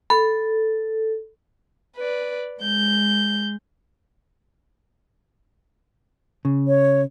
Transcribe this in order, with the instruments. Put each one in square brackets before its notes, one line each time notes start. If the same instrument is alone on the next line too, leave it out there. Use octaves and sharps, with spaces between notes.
[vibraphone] A4 [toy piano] B5
[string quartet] B4 D5
G#3 G6
[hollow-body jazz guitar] C#3
[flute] C#5